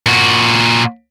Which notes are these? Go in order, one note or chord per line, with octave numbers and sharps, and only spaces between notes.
A#2 F#4